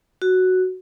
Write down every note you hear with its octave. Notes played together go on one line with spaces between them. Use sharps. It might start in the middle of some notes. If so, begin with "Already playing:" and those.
F#4